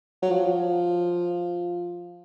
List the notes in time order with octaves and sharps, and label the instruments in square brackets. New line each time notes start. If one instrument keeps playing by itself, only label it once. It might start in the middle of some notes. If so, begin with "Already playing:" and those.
[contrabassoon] F#3
F3